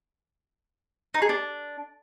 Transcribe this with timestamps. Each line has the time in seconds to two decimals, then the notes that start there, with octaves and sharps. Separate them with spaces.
1.14 D#4
1.22 G#4
1.29 D4